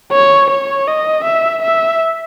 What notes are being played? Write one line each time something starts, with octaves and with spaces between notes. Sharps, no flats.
C#5
C#5
D#5
E5
E5